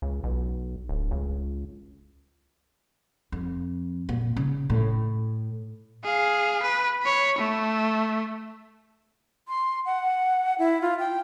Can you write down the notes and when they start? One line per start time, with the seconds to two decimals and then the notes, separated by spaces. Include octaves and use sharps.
0.02 C#2
0.24 B1
0.89 D1
1.11 C#2
3.32 F2
4.09 A#2
4.37 C#3
4.70 A2
6.04 G#4 F5
6.63 B4
7.02 C#5 B5
7.38 A3
9.48 C6
9.86 F#5
10.59 E4
10.82 F4
10.99 G5